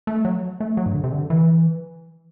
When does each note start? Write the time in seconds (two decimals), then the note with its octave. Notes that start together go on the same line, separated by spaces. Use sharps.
0.07 A3
0.25 F#3
0.60 A3
0.77 F#3
0.86 G2
0.94 D3
1.04 C3
1.12 D3
1.30 E3